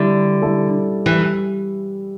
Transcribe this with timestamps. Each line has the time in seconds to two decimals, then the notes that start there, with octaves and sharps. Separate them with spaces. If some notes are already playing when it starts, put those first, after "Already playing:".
Already playing: D3 G3 E4 A4 D5
0.42 G3 E4 A4 D5
1.06 E3 G3